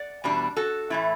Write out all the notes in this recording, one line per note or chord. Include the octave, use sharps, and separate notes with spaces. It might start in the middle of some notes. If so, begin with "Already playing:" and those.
Already playing: D5 F#5
E2 B2 G3 D4
F#4 A4
A2 E3 A3 E4